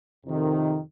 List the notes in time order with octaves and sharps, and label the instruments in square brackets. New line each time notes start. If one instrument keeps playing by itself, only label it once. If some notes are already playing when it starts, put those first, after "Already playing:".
[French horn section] F2 C3 D#3